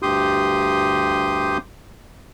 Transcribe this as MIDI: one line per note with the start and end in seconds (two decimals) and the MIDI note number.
0.03 1.58 38
0.03 1.58 43
0.03 1.58 67
0.03 1.58 84
0.03 1.58 87
0.03 1.58 91